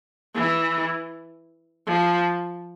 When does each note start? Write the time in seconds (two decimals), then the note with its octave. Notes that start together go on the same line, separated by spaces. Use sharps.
0.35 E3
1.87 F3